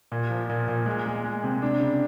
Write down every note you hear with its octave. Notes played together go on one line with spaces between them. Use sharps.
A#2
F3
A#2
A#2
G#3
G#3
G#3
C3
D4
C#3